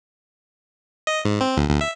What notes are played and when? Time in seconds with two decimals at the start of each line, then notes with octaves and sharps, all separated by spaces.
1.07 D#5
1.25 G#2
1.41 C4
1.57 D2
1.69 D2
1.81 E5